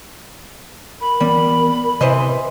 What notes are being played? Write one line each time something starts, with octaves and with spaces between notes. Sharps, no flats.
A#4 B5
E3 G3 B3
C3 E3 B4 C5 D#5